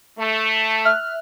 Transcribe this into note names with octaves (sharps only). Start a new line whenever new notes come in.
A3
E5 F6 F#6